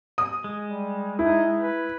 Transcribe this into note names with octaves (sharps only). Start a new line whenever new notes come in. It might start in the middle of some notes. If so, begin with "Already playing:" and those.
D#6
G#3
G3
D#4 E4
B4